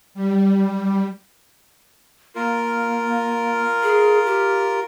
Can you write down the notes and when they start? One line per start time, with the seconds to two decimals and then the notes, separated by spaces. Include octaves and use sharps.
0.14 G3
2.35 A#3 F4 A#4
3.83 G#4
4.26 G4